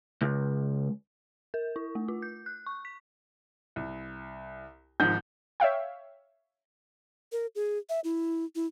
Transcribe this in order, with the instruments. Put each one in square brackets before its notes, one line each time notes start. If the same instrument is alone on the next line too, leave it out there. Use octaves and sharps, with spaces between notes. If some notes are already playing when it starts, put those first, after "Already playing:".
[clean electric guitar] C#2
[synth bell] A#4
E4
A3
F4
G6
F#6
C#6
B6
[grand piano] C2
[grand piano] G#1 G#2 F3 [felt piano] G6
[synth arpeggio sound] C#5 E5 F5 G5
[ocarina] A#4
G#4
E5
E4
E4